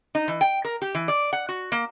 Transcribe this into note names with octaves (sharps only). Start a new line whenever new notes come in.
D#4
E3
G5
A#4
G4
E3
D5
F#5
F#4
A#3